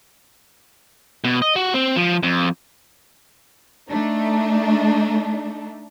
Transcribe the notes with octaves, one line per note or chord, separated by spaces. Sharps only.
B2
D#5
F#4
C4
F3
F2
A3 D4 D#4